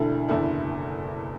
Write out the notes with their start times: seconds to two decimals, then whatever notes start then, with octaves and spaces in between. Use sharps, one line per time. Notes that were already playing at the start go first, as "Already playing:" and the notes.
Already playing: E1 D2 D3 E4 A4
0.28 F#1 E2 D3 E4 A4